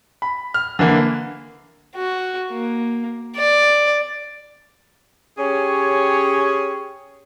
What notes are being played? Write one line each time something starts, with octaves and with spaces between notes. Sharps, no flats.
B5
F6
D3 E3 A#3
F#4
A#3
D5
C#4 G4 G#4 C#5